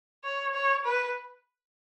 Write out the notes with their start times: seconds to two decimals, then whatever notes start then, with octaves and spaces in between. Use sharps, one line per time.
0.24 C#5
0.55 C#5
0.85 B4